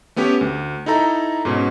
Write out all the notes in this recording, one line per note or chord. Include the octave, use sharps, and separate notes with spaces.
A3 B3 C#4 G4
D2
D#4 E4 A4 A#5
G#2 B2 C#4